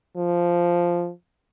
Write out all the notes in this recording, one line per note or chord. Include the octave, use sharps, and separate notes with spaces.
F3